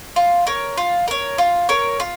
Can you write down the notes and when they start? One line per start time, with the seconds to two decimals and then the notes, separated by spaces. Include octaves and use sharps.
0.16 F4
0.47 A#4 C#5
0.77 F4
1.08 A#4 C#5
1.38 F4
1.69 A#4 C#5
2.00 F4